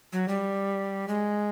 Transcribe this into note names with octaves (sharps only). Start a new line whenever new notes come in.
F#3
G3
G#3